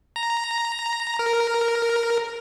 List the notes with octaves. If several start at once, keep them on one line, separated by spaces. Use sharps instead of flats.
A#5
A#4